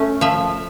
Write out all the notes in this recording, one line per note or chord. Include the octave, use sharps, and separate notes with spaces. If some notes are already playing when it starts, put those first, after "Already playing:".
Already playing: A3 C#4
F3 E5